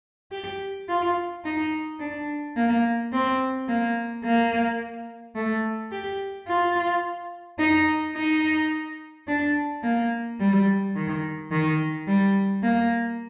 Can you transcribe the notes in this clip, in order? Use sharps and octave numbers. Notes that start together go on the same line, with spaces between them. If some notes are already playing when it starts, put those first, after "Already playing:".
G4
F4
D#4
D4
A#3
C4
A#3
A#3
A3
G4
F4
D#4
D#4
D4
A#3
G3
D#3
D#3
G3
A#3